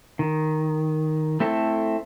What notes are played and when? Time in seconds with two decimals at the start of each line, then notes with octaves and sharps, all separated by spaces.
0.19 D#3
1.40 A3 C4 E4 A4